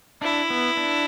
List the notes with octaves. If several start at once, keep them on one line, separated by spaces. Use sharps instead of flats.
D4 E4
B3
D4